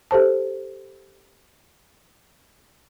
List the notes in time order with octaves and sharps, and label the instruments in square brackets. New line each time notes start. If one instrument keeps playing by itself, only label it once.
[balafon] G4 A4 C5 A5